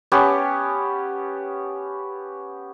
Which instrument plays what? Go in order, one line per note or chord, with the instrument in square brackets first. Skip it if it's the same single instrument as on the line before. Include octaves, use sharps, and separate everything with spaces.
[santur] B3 C#4 G4 A5